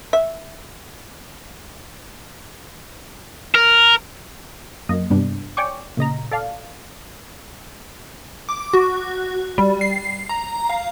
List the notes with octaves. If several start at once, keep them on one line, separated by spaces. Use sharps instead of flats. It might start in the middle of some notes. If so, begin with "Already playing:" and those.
E5
A#4
F#2 A#3 D#5
G2 C3 G3 B3 D4
C#5 D5 G5 G#5 C#6 D6
A#2 C#3 D#5 A#5
A4 D5 F5
D6
F#4
G3
C7
A#5
F5